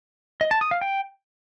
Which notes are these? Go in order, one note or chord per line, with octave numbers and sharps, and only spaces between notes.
D#5
A5
D#6
F5
G5